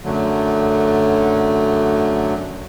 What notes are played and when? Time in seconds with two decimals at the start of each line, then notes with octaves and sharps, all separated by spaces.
0.05 F#2 D3 F#3 A3